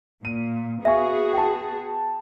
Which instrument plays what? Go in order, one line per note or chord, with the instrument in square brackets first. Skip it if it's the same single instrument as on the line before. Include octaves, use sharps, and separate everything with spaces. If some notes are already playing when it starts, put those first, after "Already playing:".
[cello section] A#2 [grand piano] D#7
[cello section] B3 F#4 G#4 [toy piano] E5 [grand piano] F5 G#5 C#6
[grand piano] G5 A5